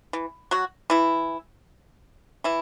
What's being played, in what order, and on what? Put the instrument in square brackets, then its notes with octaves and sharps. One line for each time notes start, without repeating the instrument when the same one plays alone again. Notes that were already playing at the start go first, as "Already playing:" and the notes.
[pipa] E3
F#3 F#4
E3 E4
E3 E4